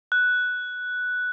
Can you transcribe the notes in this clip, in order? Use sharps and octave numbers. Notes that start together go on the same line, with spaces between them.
F#6